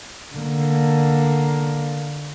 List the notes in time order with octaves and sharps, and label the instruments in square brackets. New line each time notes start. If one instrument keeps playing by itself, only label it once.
[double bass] D3 A#3